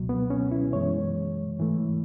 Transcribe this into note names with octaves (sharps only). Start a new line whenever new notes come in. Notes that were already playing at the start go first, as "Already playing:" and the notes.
Already playing: C#2 B2 F#3
B3
C#4
E4
F#2 E3 G#3 C#5
G#2 E3 A3